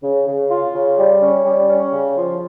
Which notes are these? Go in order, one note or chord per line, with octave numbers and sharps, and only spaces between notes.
C#3
C#3
F4
C#3
G3
C#4
G3
C#4
C#3
F3